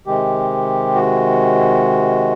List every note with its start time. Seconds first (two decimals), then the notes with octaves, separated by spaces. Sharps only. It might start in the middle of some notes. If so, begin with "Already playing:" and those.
0.07 C3 D#3 G#3 G4
0.95 F#4